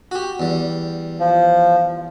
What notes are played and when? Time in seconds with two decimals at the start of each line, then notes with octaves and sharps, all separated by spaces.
0.11 F#4 G4
0.40 E2 G3
1.20 F3